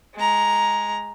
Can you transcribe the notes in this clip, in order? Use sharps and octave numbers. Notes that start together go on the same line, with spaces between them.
G#3 A#5